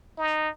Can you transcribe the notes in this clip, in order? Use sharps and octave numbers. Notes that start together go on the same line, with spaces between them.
D#4